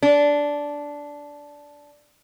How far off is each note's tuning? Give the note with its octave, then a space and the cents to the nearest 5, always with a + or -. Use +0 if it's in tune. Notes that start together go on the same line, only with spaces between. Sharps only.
D4 -10